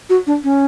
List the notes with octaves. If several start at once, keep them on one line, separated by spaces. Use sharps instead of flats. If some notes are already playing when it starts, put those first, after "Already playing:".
F#4
D4
C#4